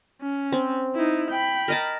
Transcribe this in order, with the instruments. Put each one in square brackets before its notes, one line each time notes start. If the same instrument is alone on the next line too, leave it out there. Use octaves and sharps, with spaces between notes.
[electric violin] C#4
[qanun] C4
[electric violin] D#4 E4
G5 B5
[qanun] A#4 D#5 A5